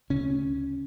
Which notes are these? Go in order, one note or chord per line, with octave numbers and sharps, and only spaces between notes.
D2 C#3 C#4